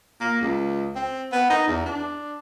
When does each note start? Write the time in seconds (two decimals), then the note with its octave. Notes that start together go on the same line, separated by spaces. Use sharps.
0.21 A#3
0.41 C#2
0.96 C4
1.32 B3
1.50 D#4
1.68 E2
1.86 D4